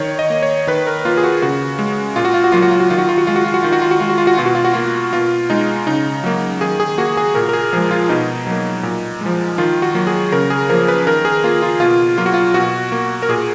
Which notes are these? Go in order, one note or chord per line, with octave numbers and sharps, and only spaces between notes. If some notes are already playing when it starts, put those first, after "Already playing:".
Already playing: D#3 C#5
D#5
A#3
C#5
D#3 B4
A#4
A#3 F4
G#4
F#4
C#3 F#4
G#3
A#2 F4
F#4
F4
F#4
F#3 A#3 F4
F#4
F4
F#4
D#3 F4
F#4
F4
F#4
G#3 F4
F#4
F4
F#4
D#3 F4
F#4
F4
F#4
G#3 F4
F#4
F4
F#4
B2 F4
F#4
F4
F#4
A#3 F4
B2 F4
G#3 D#4
C#3 D#4
F#3 A#3
D#3 G#4
G#4
A#3 F#4
G#4
A#2 A#4
A#4
G#4
F3 G#3 G#4
F4
B2 D#4
F#3 A#3
A#2
F3 G#3
D#3 F4
F#4
F#3 A#3
G#4
C#3 A#4
G#4
F3 A#3 A#4
B4
D#3 A#4
G#4
A#3 F4
F4
B2 F4
F#3 A#3 F4
F#4
F4
B2 F#4
A#3
A#4
A#2 G#4